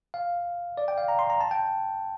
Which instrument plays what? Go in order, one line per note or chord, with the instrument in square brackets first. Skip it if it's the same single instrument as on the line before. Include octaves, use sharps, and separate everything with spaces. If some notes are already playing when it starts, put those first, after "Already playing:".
[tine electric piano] F5
D5
G5
F5
A#5
C6
A#5
A5
G5